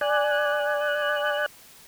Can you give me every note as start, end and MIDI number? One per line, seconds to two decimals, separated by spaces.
0.01 1.46 74
0.01 1.46 80
0.01 1.46 90